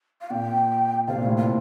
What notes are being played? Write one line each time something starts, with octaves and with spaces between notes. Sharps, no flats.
F5
A#2 G5
C3 F5
A#2
A2
A#2 F5